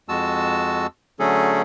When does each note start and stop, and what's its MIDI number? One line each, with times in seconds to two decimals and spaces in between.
0.09 0.87 41
0.09 0.87 56
0.09 0.87 66
0.09 0.87 81
0.09 0.87 88
1.20 1.62 50
1.20 1.62 54
1.20 1.62 57
1.20 1.62 61
1.20 1.62 68
1.20 1.62 69